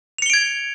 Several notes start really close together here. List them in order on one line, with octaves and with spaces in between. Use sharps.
F7 C#7 G7 D7 G#6